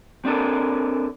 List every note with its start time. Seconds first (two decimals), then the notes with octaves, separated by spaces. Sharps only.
0.25 C4 D4 A4 A#4